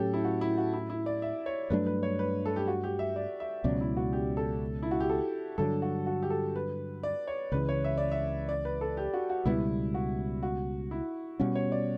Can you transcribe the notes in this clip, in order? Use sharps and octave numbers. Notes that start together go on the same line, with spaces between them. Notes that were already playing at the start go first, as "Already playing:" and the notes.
Already playing: A2 F#3 C#4 G4 A4
E4
F#4
E4
F#4
E4
E4
D5
E5
C#5
G2 F#3 A3 D4 B4
B4
C#5
B4
A4
G4
F#4
G4
E5
D5
E5
C#2 B2 F#3 C#4 D5
E4
F#4
G4
A4
E4
F#4
G4
A4
G2 D3 F#3 A4
F#4
F#4
G4
A4
B4
D5
C#5
C#2 C#3 E3 B4
C#5
E5
D5
E5
D5
B4
A4
G4
F#4
F#4
C#2 B2 G3 B3 E4
F#4
F#4
E4
B2 G3 C#4 F#4
C#5
D5